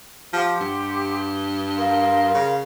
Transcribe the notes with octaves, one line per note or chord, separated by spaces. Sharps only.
F3 G4 F#5 C6
G2
A#4 F5 C6
C#3